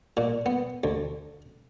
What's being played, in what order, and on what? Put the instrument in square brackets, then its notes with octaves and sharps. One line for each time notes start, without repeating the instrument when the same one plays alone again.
[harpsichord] A#2
B3
D2